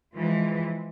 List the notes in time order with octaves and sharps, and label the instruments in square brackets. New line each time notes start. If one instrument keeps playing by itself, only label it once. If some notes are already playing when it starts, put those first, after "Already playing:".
[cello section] E3 F3 G#3